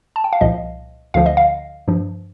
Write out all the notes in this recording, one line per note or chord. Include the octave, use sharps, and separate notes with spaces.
A5
G5
F5
C2 A#2 F3 D#5
D2 D3 F3 F5
D#5
F5
G2 F3